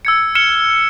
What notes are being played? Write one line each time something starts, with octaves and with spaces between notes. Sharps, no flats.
E6 G#6 C#7
F6 C#7 E7 G7